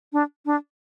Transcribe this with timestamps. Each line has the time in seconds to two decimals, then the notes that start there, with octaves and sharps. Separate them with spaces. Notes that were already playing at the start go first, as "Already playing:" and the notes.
0.13 D4
0.46 D4